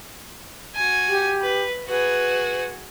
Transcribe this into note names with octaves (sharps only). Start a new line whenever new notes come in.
F#4 G#5
G4
B4
F#4 G#4 B4